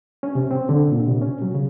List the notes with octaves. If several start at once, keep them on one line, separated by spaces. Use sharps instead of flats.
C#4
C3
C4
D3
A#2
C3
C#4
F#3
C#3